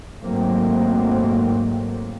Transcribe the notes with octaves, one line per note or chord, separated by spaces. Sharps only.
G#1 G#2 F#3 A3 A#3 C4